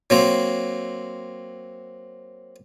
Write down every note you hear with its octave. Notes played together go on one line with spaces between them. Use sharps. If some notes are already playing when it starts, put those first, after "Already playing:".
F#3 A#3 C4